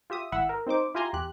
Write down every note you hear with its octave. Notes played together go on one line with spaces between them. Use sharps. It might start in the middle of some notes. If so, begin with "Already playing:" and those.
F4 G4 E5 D#6
G#1 E4 E5 F#5 E6
A#4
C4 D#4 C5 D6
E4 F4 G4 G#5 A#5 C6
E2 G4 F#6